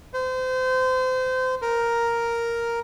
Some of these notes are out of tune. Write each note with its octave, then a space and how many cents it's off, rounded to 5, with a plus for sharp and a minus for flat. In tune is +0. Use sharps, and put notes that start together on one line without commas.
C5 -30
A#4 +0